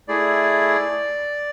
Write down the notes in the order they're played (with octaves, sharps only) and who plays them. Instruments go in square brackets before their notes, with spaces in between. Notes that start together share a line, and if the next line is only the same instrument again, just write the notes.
[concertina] A3 E4 G#4 D5